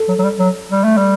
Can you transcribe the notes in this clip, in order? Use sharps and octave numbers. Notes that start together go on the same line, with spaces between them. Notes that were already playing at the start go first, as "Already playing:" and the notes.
Already playing: A4
F#3
F#3
G3
F#3
G3
A3
G3